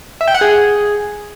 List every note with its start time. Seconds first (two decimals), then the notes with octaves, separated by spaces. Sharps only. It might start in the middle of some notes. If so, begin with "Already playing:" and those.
0.21 E5
0.28 G5
0.34 F#5
0.41 G#4